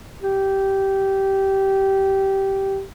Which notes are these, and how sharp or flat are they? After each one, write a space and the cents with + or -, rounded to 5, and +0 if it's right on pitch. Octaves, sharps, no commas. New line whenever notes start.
G4 -15